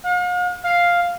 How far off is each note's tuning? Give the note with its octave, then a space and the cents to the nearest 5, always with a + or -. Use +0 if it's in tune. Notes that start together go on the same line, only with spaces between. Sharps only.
F5 +45
F5 +0